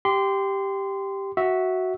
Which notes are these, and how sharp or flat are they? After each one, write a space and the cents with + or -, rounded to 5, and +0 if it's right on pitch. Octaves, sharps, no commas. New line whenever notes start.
G4 +0 C6 -20
F#4 +5 E5 -10